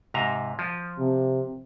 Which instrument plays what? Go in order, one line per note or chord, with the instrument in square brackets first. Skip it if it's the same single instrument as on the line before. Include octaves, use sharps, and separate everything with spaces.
[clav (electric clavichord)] G#2 C3 A#5
F3
[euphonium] C3